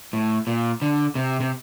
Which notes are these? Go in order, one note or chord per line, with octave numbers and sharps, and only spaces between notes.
A2
A#2
D3
C3
C3